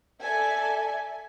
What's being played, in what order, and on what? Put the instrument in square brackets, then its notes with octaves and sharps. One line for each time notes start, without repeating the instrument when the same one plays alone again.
[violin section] A4 D5 E5 G#5